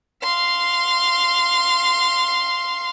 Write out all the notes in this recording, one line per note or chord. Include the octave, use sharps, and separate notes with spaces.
F5 C6